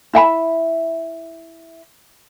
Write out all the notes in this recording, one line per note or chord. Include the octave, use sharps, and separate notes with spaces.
E4 E5 G5 B5